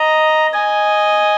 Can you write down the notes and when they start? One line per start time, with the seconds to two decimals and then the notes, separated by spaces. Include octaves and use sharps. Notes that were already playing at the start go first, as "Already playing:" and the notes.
Already playing: D#5 A#5
0.53 D#5 G#5